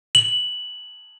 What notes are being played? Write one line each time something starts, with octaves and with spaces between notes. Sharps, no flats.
F#7